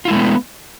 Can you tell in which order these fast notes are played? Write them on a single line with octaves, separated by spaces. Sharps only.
F4 E4 G#3 A3 B3